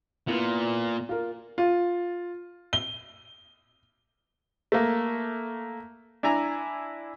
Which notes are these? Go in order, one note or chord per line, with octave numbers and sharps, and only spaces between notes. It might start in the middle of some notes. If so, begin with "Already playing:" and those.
A#2 B3 E4
F4 A#4
F4
G7
A3 A#3
D4 E4 G#5 A#5